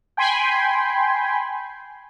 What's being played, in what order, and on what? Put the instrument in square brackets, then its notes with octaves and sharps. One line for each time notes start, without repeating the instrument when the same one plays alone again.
[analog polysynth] G5 G#5 B5 C6